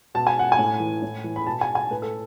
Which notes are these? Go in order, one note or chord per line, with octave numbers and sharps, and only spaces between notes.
B2 A5
G#5
F#5
G#5
A2
E3
A2
E3
B5
B2 A5
G#5
G#5
A2 B4
A4